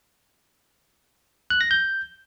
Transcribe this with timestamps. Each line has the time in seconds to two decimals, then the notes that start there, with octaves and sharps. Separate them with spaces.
1.50 F#6
1.61 A#6
1.71 G6